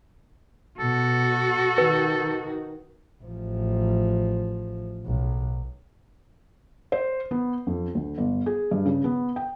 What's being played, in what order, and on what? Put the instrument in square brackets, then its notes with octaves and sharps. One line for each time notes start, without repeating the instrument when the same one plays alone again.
[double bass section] B2 [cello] F#4 [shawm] A4
[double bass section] D#3 [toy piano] B4
[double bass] A1 F3
B1
[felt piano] C5
B3
F2
D2
G1
G#4
G2
C#3
B3
G5